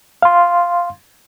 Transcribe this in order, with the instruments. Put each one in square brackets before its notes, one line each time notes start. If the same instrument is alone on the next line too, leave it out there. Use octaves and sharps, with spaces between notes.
[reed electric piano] F5 C6